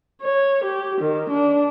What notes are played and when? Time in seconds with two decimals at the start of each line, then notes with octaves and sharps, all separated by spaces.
0.22 C#5
0.65 G4
1.01 D#3
1.30 D4